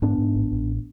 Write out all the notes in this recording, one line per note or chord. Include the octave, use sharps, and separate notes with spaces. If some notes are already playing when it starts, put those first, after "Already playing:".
G#2 B3 D4
G#2
A1
A1